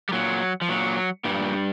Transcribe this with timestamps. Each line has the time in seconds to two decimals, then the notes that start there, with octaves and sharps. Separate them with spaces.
0.09 G3
0.13 A#2 F#3
0.61 F3
0.69 A#2 F#3
1.24 G2 A#2 G3